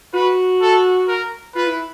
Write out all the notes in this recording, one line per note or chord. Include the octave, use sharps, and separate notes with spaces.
F#4 B4
A4
A#4
F4 B4
E4